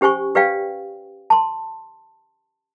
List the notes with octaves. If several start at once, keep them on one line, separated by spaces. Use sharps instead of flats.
C#4 G4 C5 G#5 C#6
G4 B4 D5 F5 G5
A5 C6